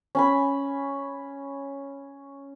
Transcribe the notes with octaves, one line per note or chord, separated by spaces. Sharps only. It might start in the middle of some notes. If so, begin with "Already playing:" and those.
C#4 G#5 B5